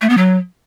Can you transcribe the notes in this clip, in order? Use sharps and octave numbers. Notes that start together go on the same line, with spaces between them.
A3
B3
F#3